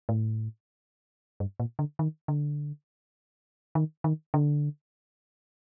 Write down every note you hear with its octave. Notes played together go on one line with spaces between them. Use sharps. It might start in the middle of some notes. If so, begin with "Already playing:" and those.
A2
G2
A#2
D3
D#3
D3
D#3
D#3
D3